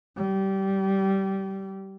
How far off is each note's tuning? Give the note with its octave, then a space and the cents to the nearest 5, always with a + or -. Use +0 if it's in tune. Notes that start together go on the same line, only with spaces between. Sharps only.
G3 -20